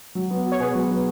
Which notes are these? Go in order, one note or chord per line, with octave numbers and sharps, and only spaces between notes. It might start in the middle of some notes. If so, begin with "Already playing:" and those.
F#3
B3
F#4
C#5
B2 G#4 B4
F#3
B3